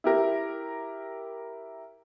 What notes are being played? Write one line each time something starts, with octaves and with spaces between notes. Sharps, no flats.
E4 G4 A#4